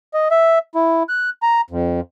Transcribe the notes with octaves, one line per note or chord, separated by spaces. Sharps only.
D#5
E5
E4
F#6
A#5
F2